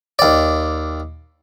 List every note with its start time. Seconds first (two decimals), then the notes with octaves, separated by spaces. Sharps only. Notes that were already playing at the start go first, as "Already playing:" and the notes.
0.19 D#2 D5